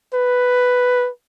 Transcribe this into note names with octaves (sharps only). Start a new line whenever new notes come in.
B4